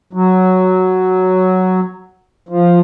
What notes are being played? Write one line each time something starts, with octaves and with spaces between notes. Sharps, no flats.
F#3
F3